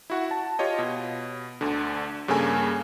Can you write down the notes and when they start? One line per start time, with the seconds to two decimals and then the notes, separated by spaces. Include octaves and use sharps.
0.10 E4 F#4 F#5
0.31 A5
0.59 F4 G4 C#5 D#5
0.79 B2
1.61 D2 D3
2.28 G2 C#3 A#3 A4 G#5